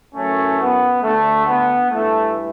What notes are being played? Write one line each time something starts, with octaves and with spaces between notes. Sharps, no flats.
F#2 E3 A3 C#4
B3
D2 D3 A3
B3
G2 E3 A3